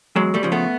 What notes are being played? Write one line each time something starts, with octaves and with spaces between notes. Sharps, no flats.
E2 F#3 G#3
G3 A3
C#3 F3
A3 B3